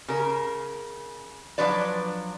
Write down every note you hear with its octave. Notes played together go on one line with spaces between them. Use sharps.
C#3 A#4
F3 F#3 D4 B4 D5